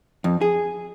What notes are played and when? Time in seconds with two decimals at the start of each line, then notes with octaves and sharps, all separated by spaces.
0.24 F2
0.41 G#4